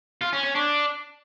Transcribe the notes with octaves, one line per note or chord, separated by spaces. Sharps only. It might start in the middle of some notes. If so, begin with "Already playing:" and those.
F4
C#4
C#4
D4